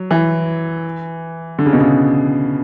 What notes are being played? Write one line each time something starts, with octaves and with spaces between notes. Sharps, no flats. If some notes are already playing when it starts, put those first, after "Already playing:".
Already playing: F#3
E3
D3
C#3
B2
C#3